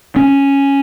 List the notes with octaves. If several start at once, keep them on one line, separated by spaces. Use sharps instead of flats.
C#4